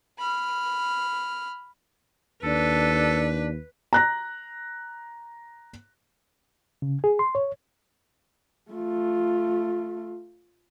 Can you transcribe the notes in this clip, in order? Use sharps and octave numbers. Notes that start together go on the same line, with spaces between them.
B5 F6
D#2 D4 A4 B4
A#5 F#6 A#6
C#3
G#4
C6
C#5
A3 F4